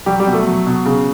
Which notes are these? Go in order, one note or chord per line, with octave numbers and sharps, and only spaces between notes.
F#3 G3 G4
G3 G4
B2
A3 A4
F#3
B2
C#3